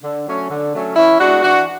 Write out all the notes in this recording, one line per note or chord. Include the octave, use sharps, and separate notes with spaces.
D3
F#3 A3 C#4
D3
F#3 A3 C#4
E3 C#4 E4
G#3 B3 D4 F#4
E3 D4 F#4